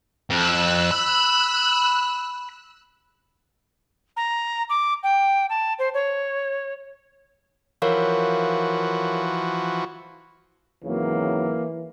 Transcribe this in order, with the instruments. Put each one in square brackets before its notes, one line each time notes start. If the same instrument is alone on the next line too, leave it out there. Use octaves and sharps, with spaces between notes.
[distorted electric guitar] F2 [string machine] E6 F#6
[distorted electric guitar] B5
[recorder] A#5
D6
G5
A5
C5
C#5
[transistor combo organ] E3 F3 F#4 [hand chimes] A#4 C#5 F5
[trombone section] G#1 C#3 F#3 [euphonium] E3 [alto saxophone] A#3